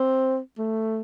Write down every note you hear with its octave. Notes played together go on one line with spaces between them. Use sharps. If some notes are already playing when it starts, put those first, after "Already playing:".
Already playing: C4
A3